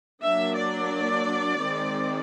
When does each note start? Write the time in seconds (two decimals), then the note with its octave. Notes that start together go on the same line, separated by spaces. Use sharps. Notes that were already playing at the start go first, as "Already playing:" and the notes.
0.22 F#3 A#3 D4 E5
0.57 D5
1.62 D#3 G#3 C4